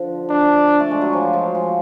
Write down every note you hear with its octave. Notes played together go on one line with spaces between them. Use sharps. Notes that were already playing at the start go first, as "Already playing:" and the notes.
Already playing: D3 F3
D4
A3
G#3
F#3
F3
F3 G#3
F3